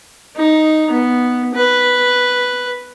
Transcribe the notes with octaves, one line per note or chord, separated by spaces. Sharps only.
D#4
B3
B4